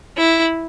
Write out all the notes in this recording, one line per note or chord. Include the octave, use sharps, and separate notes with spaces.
E4